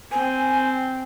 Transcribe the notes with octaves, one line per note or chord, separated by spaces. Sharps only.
C4 G#5